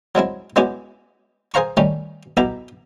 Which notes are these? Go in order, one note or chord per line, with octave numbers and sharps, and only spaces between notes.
F#3 G#3 C4 E4
G#3 B3 C#4 E4 F#4 G4
G#4 A#4 C5 F5 A#5 C#6
D#3 G3 A3 C#4
B1 B2 E4 G4 A#5 B5